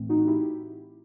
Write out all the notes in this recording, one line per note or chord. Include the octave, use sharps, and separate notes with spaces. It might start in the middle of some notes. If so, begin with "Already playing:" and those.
Already playing: A2 E3 A3 C4
D#4 F#4
E4 G4